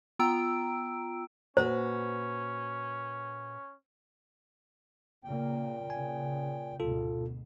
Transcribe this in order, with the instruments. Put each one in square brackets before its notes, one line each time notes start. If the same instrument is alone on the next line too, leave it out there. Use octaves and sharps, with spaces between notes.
[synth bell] B3 F4 G5 A#5 E6 D7
[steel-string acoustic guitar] A#2 F#4 B4 [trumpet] C#4 [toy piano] C5
[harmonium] A#2 G5 [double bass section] C#3 A#3
[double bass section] C#3 [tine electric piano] G#5
[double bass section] D2 G#2 B2 [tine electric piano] F4 A4